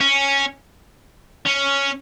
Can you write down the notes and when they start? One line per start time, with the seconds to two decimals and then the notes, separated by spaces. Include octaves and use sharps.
0.01 C#4
1.47 C#4